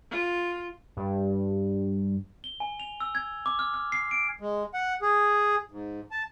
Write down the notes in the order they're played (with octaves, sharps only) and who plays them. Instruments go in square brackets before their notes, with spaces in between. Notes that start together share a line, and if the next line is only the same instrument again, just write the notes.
[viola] F4
[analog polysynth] G2
[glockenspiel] G7
G#5
F7
E6
G#6
D6
F6
F6
C7
D7
[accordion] G#3
F#5
G#4
G#2
A5